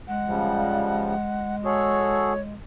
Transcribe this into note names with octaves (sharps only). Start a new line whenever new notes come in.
G#3 F#5
C#3 F3 G3
F#4 G#4 A4 C#5